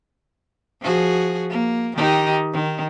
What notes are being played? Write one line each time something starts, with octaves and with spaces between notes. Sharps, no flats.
F3 F#4 G#4
A#3
D#3 D#4 G4
D#3